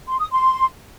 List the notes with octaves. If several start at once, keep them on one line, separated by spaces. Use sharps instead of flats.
C6
D#6
C6